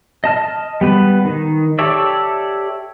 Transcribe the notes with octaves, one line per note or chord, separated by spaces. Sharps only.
D#5 A5 F6
G3 B3 B4
D#3
G4 A4 C#5 D5 E5